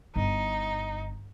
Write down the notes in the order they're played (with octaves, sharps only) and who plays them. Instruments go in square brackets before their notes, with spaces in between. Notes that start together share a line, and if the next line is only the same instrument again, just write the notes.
[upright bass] G1 [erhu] D#4